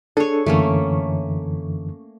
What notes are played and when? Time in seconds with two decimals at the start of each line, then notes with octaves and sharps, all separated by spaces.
0.17 D4 G#4 A4 C#5
0.46 F#2 D3 E3 A3 A#3 C#4